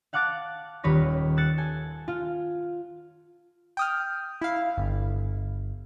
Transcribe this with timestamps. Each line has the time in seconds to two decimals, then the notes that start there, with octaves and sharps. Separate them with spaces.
0.13 F5 F#5 A5 D6 F#6 A6
0.83 D#1 D#2 B4 C#5 A#6
1.37 E6 F#6 A6 C#7
1.58 A4 G#5
2.08 F4
3.77 G5 D#6 F6
4.41 E4 F5
4.78 G1